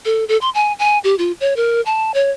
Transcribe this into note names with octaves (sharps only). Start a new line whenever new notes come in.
A4
A4
C6
G#5
G#5
G4
F4
C#5
A#4
A5
C#5